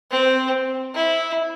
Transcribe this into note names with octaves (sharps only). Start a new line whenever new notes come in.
C4
E4